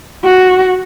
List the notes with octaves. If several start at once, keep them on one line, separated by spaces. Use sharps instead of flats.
F#4